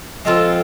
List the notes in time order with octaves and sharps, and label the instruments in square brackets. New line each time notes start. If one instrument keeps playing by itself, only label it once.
[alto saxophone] F3 [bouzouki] G#3 C4 F4 A4